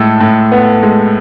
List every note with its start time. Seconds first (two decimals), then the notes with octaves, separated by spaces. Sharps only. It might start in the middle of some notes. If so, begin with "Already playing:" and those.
Already playing: A2 G#3 A4
0.21 A2
0.52 B3
0.83 G#3